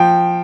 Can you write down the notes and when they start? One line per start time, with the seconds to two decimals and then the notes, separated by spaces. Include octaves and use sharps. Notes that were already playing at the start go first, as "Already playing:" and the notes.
Already playing: F3 G5